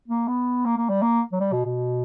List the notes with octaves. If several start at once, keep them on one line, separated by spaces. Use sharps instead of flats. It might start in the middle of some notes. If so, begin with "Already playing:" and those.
A#3
B3
A#3
A#3
G3
A#3
F#3
G3
B2
B2